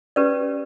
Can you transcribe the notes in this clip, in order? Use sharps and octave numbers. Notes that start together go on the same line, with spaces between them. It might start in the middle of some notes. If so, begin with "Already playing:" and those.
C#4 G4 B4 D5